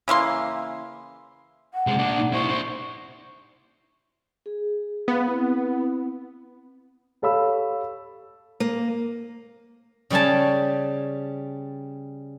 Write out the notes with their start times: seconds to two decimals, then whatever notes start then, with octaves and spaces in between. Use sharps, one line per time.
0.08 C#3 E3 A#3 C6
1.74 F#5
1.87 C3 G#3
1.98 A#2 D4
2.17 D#4
2.33 E4 C5 C#6
2.49 D4 C5
4.46 G#4
5.08 B3 F5
5.28 C4 E4
7.22 G4 A4 C#5 F5 B5 E6
8.60 A#3
10.10 C#3 G3 C#4 G#5 A5